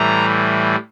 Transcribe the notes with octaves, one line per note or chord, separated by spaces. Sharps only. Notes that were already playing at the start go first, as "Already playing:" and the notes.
Already playing: A2 E3 G3 A#5